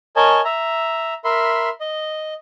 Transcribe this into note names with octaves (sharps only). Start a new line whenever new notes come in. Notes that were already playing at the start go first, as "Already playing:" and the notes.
A#4 C#5 D#5 G#5 A5
E5 A#5
A#4 E5 B5 C6
D#5